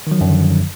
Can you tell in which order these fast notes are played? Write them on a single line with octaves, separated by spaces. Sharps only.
D#3 F#3 F3 F#2 D3